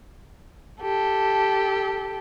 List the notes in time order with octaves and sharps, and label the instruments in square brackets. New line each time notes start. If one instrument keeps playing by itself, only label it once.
[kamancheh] G4 A4